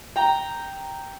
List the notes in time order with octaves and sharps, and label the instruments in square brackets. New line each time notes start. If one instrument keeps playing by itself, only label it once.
[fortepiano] G5 A#5